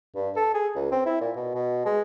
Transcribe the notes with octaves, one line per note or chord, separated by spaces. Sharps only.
G2
A4
G#4
C#2
C4
E4
A#2
B2
B2
G#3